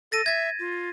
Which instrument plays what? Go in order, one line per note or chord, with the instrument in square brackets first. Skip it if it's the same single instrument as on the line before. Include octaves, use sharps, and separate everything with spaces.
[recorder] A4 [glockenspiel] A6 A#6 D#7
[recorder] E5 [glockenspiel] G#6 A6
[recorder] F4